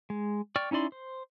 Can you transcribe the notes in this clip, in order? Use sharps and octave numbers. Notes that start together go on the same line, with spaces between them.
G#3
D5 G5 C#6 F6
C#4 D#4 E4 D5 C6
C5